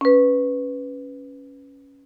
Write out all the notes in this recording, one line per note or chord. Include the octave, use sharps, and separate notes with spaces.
C#4 B4